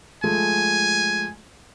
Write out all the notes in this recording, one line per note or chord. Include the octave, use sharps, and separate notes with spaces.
F3 G#3 A3 G#5